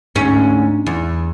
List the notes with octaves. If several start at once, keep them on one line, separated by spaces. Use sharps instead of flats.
D2 G#2 C#4
E2